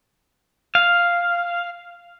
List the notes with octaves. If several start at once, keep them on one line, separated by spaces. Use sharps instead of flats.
F5